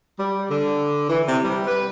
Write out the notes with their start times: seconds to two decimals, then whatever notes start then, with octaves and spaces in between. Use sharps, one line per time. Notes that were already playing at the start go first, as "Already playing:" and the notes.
0.18 G3
0.50 D3
1.09 E3
1.26 C3
1.42 G3
1.66 B4